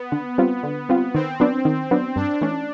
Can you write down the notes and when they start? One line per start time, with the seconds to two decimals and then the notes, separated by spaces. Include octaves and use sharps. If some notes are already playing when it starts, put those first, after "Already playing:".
Already playing: B3
0.12 D3
0.38 G3 C4 F4
0.63 D3
0.89 G3 C4 F4
1.15 D#3 C4
1.40 F#3 B3 D4
1.65 D#3
1.91 F#3 B3 D4
2.16 G2 D4
2.41 E3 A3 C#4